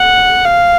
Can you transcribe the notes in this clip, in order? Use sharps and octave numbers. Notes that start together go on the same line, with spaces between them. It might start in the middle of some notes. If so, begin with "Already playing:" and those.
Already playing: F#5
F5